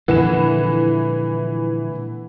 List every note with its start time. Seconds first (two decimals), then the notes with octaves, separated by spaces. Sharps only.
0.08 A#2 D3 E3 F3 G#3 F#5 E7